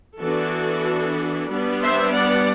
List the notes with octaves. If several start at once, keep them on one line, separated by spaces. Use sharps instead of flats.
E3 B3 D4 F#4 A4
G3 B3 D4
C5 E5
D5 F#5